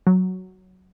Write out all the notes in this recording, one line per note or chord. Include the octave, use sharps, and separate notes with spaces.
F#3